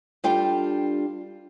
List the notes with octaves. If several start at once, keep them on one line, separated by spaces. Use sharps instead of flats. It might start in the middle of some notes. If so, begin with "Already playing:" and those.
G3 D4 F4 A4 F5 G5